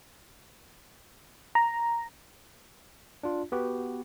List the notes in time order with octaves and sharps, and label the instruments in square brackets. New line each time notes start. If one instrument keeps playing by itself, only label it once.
[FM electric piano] A#5
[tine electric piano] D4 F4
B3 F#4 G4 B4